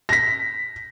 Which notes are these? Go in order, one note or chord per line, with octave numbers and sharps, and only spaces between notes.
A#6 B6